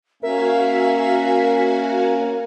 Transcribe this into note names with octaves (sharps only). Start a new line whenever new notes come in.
A#3 C#4 F#4 A#4 E5 F5 G#5